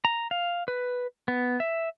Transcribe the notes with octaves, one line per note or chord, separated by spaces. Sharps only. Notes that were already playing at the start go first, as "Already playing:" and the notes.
A#5
F5
B4
B3
E5